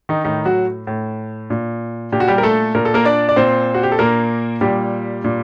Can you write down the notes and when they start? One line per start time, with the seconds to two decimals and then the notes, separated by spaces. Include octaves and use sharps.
0.09 D#3 D#4
0.25 A2 D#3 D#4
0.45 F#3 F#4
0.87 A2
1.50 A#2
2.12 A#2 G4
2.20 F#4
2.28 G3 G4
2.38 A#4
2.43 A3 A4
2.75 A#2 A#4
2.85 A4
2.94 A#3 A#4
3.05 D4 D5
3.29 D5
3.36 A#2 C4 C5
3.75 F#4
3.83 G4
3.92 A4
3.99 A#2 A#3 A#4
4.61 A#2 G3 G4
5.24 A#2